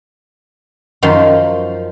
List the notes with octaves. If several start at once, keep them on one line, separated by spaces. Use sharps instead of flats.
F#2 D#3 F3 C6